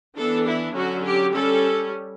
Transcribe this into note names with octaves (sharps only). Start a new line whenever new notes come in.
E3 B3 D4 A4
E4
D3 F#3 C#4 F#4
G4
G3 C#4 A4